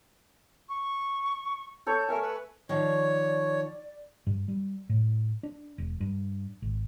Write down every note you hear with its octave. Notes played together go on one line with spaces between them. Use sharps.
C#6
A4 C#5 G6
A3 A#4 E5 G#5
B4
D#3 F3 C#5 D5
G2
G3
A2
D4
E1
G2
G#1